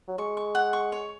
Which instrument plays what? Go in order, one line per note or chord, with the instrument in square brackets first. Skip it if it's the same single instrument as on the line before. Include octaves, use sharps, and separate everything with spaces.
[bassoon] F#3
[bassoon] G#3 [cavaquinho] C#6
[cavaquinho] C#6
F#5
C#6
C#5